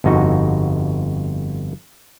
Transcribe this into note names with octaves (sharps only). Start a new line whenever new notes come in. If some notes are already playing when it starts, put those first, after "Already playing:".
G1 F2 D#4 F#4